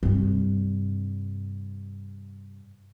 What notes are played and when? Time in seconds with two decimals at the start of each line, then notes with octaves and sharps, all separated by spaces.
0.03 G2 C3